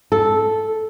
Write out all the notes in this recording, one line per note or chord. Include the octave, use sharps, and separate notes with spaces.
A4